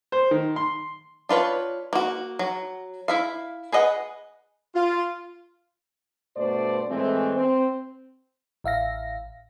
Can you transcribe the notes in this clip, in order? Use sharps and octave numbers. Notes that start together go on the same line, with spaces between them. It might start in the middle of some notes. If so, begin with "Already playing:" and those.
C5
D#3
C6
D4 F4 B4 C#5
A#3 F#4
F#3
E4 E5 F5
G#4 B4 D#5 F#5
F4
G2 B2 A3 C5 D5
A2 E3 G#3 A3 C4
C4
A1 E5 F5 A#6